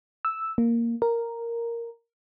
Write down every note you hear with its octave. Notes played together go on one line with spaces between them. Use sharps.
E6
A#3
A#4